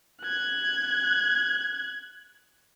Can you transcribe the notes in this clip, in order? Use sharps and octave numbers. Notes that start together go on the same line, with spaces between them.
F#6 G#6